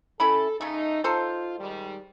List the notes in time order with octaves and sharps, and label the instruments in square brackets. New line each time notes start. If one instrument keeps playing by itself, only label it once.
[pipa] C#4 E4 B5 [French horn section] A4
[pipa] C#3 A3 [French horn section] D#4
[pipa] D#4 A4 C5 [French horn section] F4
[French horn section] G#2 D#3 G3